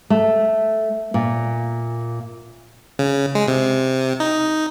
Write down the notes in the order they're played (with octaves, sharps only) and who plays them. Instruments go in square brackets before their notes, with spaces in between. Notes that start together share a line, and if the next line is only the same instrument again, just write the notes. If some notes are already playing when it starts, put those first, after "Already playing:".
[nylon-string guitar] A3
A#2
[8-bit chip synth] C#3
G#3
C3
D#4